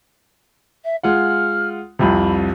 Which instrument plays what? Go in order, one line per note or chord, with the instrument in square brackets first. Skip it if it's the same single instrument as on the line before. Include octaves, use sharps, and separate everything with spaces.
[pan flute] E5
[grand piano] G#3 F4 F#5 [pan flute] F6
[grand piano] C2 F2 C3 [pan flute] B5